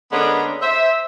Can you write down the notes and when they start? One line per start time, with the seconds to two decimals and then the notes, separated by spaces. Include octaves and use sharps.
0.12 D3 G#3 A#3 B3 C#4 D4
0.62 C5 E5